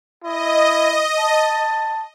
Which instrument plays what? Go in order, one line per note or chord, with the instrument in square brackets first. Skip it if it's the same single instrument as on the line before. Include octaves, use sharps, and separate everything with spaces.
[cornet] E4 [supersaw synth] D#5
[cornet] A5